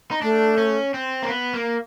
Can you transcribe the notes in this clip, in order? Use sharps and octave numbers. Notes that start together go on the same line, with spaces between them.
D#4
A3 D4
C#4
C4
A#3
B3
A#3